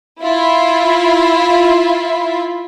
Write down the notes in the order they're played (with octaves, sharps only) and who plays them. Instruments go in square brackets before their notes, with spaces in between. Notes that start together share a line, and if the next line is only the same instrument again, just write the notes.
[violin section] E4 F4 E5